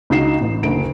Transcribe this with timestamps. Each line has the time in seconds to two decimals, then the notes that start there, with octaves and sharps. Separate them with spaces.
0.10 C#2 D#4 F#4 C7 E7
0.41 A1
0.63 F#1 D2 D7